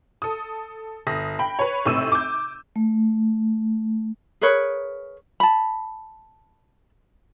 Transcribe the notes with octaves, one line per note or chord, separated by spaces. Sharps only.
A4 D#6
G1 D#6 A#6
G5 B5
B4 C#5
G#1 A2 C3 C#6 E6 D#7
D6 G6
A3
G#4 A#4 B4 C#5
A5 B5